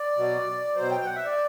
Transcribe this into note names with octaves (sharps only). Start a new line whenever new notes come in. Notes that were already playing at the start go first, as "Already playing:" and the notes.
Already playing: D5
B2 F#3
B2 F#3 C5
G5
G5
F#5
E5
D5